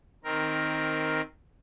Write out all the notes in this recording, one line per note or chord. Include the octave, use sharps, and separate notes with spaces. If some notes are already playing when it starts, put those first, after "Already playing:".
D#3 C4 A#4